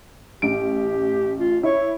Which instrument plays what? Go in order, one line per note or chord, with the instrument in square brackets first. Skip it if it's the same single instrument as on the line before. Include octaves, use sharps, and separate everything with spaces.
[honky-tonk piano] A1 D7 [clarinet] G4
[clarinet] F4
[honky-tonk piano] E4 [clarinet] C#5